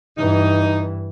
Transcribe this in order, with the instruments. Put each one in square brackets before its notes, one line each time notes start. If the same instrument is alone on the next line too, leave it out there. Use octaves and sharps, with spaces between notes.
[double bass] G2 E3 [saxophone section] D#4